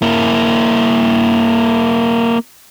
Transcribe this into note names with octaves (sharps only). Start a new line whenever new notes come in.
A#3 E4